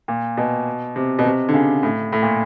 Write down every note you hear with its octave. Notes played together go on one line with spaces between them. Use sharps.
A#2
B2
C3
B2
C3
D3
C#3
A2
A2
A#2